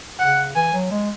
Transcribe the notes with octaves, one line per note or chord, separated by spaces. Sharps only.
C#3 F#5
E3 G#5
F#3
G#3